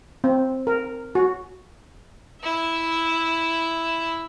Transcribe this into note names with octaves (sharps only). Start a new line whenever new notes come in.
C4
A#4
F#4
E4 E5